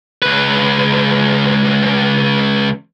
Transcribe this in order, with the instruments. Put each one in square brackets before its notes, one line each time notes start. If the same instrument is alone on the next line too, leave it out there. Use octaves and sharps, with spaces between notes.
[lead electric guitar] C#2 B4